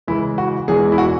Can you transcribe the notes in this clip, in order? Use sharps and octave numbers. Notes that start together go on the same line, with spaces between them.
C#2 C#3 E3 G#3 E4
F#4
E1 E2 E3 G#3 G#4
E4
F#4